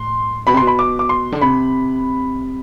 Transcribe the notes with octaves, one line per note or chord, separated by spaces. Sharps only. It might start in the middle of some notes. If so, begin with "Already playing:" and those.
Already playing: A2 C6
B2 B5
C3
B2 C6
B5
D6
D6
C6
D3
C3 B5